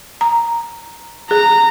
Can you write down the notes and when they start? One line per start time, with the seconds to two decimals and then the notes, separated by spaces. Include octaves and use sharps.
0.21 A#5
1.31 G#4 A#5